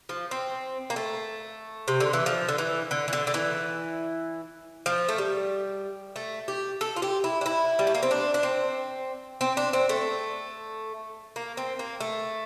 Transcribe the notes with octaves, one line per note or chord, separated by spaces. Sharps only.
F3
C4
A#3
A3
C3
D3
E3
F3
D3
E3
D3
E3
D3
D3
E3
F3
A3
G3
A3
G4
A4
F4
G4
E4
D4
E4
G3
A3
A#3
C4
D4
D4
C4
C4
D4
C4
A3
A#3
C4
A#3
A3